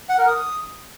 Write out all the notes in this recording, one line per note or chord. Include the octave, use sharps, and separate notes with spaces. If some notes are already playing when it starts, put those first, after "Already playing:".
F#5
A#4
D#6